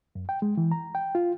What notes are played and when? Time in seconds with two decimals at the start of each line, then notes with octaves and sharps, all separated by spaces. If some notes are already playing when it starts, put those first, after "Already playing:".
0.15 F#2
0.29 G5
0.42 G#3
0.57 E3
0.72 A#5
0.95 G5
1.15 F4